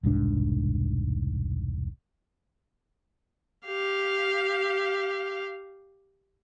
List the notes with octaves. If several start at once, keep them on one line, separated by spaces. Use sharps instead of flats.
E1 C2 G#2 D4
G4 F5